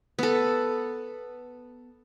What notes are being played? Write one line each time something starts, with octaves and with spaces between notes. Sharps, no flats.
B3 A4